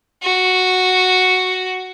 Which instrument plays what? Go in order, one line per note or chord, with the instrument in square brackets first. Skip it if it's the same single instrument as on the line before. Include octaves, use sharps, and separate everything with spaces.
[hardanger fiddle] F#4